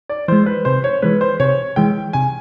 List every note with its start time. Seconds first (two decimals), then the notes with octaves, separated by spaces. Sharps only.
0.09 D5
0.28 E3 G#3 C5
0.46 B4
0.65 C3 C5
0.84 C#5
1.02 E3 G#3 B4
1.21 C5
1.40 C3 C#5
1.76 E3 G#3 G5
2.13 C3 G#5